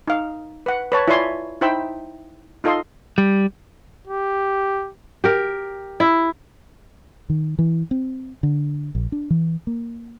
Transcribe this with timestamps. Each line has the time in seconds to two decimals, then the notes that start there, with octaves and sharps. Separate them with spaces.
0.08 D#4 F5
0.66 B4 F#5
0.92 B4 C#5 A5
1.08 E4 F4 C#5 D5 G#5 C6
1.61 D#4 E4 C5 G5 B5 E6
2.64 D#4 F4 A4 D#5 F5 C6
3.18 G3
4.08 G4
5.24 G4 A#4
6.00 E4
7.30 D#3
7.59 E3
7.91 C4
8.43 D3
8.95 A#1
9.12 D4
9.30 E3
9.67 A#3